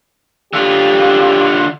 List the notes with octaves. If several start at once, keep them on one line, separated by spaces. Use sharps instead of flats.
D3 F4 G4